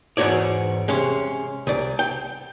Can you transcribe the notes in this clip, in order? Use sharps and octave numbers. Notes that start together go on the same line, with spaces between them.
E2 G#2 B2 F#4 C#5 D5
C3 G#3 C#4
C2 D5
G5